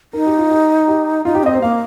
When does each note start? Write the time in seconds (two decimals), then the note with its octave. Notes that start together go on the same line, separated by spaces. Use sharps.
0.13 D#4 A#4
0.26 G4
0.38 F4
0.51 G4
0.88 G4
1.25 D#4 F4
1.35 G4
1.43 C4 D#5
1.54 C5
1.62 A#3 F5